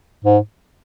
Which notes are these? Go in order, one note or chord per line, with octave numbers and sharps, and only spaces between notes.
G#2